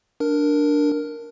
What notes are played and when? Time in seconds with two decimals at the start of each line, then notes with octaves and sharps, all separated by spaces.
0.20 D4 A#4